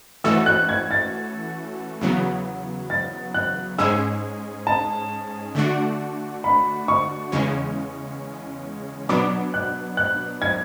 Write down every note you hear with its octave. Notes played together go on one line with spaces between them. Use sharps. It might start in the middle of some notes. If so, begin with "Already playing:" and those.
E3 A3 C#4 F#4 A4 E6
F#6
G#6
A6
E2 C#3 F#3 B3
A6
F#6
G#2 G#3 C#4 G#4 E6
A5
D3 A3 D4 F#4
B5
C#6
E2 C#3 G#3 C#4
B2 F#3 B3 D4 D6
F#6
F#6
G#6